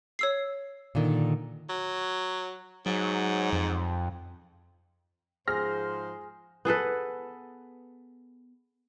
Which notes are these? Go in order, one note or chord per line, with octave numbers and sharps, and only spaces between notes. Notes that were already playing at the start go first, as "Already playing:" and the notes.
C#5 E6 C7
A#2 D3 D#3
F#3
G#2 F#3
F2
G#2 F3 G#4 C5 F6 A#6
B3 G#4 A4 B4